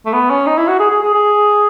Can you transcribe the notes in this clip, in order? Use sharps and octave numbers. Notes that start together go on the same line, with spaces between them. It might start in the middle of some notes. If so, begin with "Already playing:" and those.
A3
B3
C#4
D#4
E4
F#4
G#4
G#4
G#4
G#4